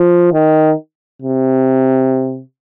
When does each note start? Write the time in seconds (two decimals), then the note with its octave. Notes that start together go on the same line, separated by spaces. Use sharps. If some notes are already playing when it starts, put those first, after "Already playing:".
Already playing: F3
0.33 D#3
1.22 C3